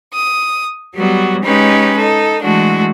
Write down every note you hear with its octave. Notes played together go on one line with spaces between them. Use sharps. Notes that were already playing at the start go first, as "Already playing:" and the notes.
D#6
F#3 G3 B3 F#4
G#3 C#4 D#4 G4 B4
D#4 A4
E3 G#3 A3 D4 F#4